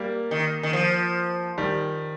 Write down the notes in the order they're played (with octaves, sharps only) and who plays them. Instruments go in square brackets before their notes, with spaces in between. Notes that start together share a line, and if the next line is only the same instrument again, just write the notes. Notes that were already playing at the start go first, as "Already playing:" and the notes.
Already playing: [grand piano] G3 A#3
[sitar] D#3
D#3
F3
[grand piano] D#3 G3